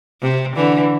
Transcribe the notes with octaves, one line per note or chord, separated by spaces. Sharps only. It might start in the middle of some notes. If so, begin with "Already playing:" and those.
C3
D3 E3